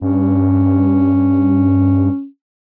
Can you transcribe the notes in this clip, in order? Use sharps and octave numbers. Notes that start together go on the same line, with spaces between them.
G2 C#4